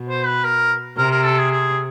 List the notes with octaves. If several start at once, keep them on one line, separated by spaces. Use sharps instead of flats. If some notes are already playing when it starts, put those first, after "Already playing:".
Already playing: B2
C5
B4
A#4
C3 A#4
A#4
A4
G#4
G#4